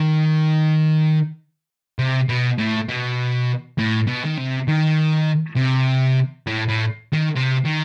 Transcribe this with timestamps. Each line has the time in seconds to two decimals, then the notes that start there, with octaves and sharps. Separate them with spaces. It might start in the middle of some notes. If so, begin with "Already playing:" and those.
Already playing: D#3
1.99 C3
2.29 B2
2.58 A2
2.89 B2
3.78 A2
4.07 B2
4.25 D#3
4.38 C3
4.68 D#3
5.56 C3
6.47 A2
6.68 A2
7.13 D#3
7.36 C3
7.65 D#3